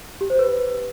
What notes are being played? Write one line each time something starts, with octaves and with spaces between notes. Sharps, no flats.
G4
C5
B4